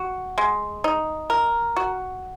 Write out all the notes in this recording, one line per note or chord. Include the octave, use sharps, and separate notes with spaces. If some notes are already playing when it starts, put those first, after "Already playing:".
Already playing: F#4
G#3
D#4
A#4
F#4